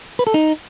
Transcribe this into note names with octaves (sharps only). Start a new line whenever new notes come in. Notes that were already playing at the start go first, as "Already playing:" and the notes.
B4
A4
D#4